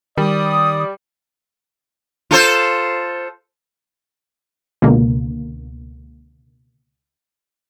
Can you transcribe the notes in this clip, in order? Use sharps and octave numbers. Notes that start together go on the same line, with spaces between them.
D#3 G3 D5 D#6
F4 A4 C5
C#2 B2 D3 A#3